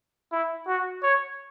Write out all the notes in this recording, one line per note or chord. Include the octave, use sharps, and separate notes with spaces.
E4
F#4
C#5